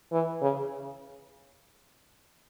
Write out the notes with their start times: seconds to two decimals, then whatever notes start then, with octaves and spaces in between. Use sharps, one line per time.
0.12 E3
0.41 C#3